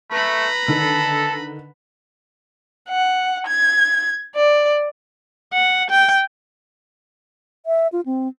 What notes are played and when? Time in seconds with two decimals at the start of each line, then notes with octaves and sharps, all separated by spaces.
0.12 A3 B4 A#5 B5
0.68 D3 D#3 A4
2.89 F#5
3.47 G#6
4.36 D5
5.53 F#5
5.90 G5
7.66 E5
7.92 F4
8.06 C4